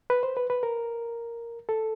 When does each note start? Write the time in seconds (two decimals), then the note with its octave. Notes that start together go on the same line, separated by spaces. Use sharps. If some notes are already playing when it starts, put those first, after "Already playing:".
0.10 B4
0.23 C5
0.37 B4
0.50 B4
0.63 A#4
1.69 A4